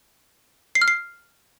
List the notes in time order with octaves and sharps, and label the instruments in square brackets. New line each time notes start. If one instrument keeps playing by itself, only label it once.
[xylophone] C7
F6
C7